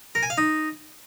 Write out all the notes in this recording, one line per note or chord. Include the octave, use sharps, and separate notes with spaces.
A#4
G#5
F5
D#4